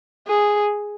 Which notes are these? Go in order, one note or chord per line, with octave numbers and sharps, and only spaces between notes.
G#4